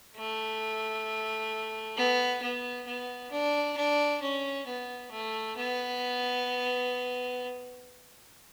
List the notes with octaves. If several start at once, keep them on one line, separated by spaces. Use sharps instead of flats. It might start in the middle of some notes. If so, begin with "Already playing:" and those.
A3
B3
B3
B3
D4
D4
C#4
B3
A3
B3